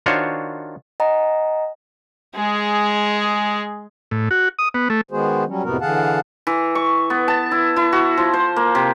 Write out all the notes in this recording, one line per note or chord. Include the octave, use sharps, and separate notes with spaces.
D#3 D4 F4 F#4 C5 C#5
D#5 F#5 G#5 A#5
G#3 G#4
A2
F#4
D#6
B3
A3
D#3 G#3 B3 F#4 G#4 C5
F#3 G3 C#4
F2 A2 C3 B3 F#4 A#4
D3 E3 G#4 F5 F#5 A5
E3
C#6
B3
A5
E4
E4
F#4
F3
C5
A#3
C3